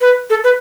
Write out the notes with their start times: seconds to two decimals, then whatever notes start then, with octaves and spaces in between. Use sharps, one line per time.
0.01 B4
0.30 A4
0.44 B4